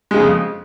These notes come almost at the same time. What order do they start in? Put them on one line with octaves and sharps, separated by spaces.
G#3 C#3 F2